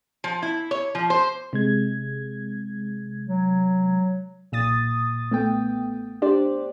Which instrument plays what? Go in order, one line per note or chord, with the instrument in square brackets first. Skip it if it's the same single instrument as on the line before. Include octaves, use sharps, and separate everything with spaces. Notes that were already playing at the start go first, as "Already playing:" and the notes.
[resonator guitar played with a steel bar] F3
E4
C#5
F3
C5
[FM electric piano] C3 G#3 G#6
[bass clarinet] F#3
[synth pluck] B1 A#2 D#6 A6
A3 B3 G5
D4 G4 C5 D5